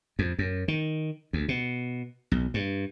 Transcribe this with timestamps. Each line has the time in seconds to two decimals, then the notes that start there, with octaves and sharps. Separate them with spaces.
0.19 F2
0.39 F#2
0.68 D#3
1.33 D2
1.48 B2
2.31 B1
2.54 G2